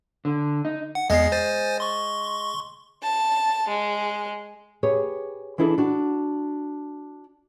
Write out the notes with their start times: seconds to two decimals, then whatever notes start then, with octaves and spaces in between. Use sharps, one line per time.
0.25 D3
0.65 D#4
0.95 F#5
1.10 E2 G#3 B3 C7
1.32 C5 G#5 A6
1.80 C6 C#6
3.03 A5
3.68 G#3
4.83 G4 G#4 B4 C#5
5.58 E3 D4 E4 G#4 A4
5.78 D4 F#4